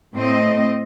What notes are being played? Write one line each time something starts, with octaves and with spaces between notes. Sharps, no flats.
A2 C4 D#5